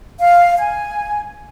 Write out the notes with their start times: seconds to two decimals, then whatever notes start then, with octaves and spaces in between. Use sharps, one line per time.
0.19 F5
0.57 G#5